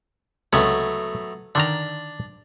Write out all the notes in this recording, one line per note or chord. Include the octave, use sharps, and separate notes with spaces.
C#2 C3 F#3 A3 B3 C#4
D3 D#3 D4 A#5